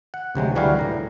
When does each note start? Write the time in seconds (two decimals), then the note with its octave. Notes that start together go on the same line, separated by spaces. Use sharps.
0.14 F#5
0.35 D2 C3 F#3 G#3
0.55 D2 E3 G3 F#4 G#4 F5
0.79 A2 A#5